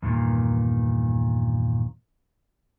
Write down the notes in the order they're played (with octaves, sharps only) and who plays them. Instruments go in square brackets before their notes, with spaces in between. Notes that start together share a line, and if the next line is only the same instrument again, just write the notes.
[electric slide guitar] E2 G2 A#2 D#3